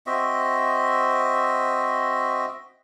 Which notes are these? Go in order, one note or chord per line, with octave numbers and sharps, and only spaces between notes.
C4 F#4 D#5 E5